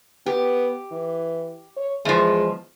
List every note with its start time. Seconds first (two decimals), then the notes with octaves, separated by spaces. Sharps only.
0.26 B3 G4
0.92 E3
1.76 C#5
2.05 E2 F3 G#3